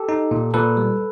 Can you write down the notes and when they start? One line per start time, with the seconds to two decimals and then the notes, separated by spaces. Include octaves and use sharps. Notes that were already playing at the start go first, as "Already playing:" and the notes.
Already playing: G4 A4
0.09 D#4
0.31 A#2
0.54 A#2 A4 B4
0.77 G3